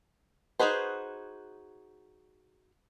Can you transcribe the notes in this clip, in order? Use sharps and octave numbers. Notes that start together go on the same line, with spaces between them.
D#4 F#4 G#4 B4 C5